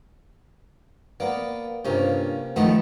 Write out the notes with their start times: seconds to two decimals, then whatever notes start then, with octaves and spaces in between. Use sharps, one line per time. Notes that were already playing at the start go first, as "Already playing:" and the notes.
1.20 A#3 B3 D5
1.85 G2 C3 A#3 C#4 F4
2.56 D#3 F3 A3 B3 D#4 D#5